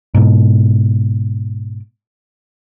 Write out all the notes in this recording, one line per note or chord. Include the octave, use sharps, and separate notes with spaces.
G#2 B2